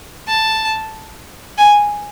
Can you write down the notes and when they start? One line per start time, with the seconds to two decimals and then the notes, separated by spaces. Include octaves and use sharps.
0.28 A5
1.58 G#5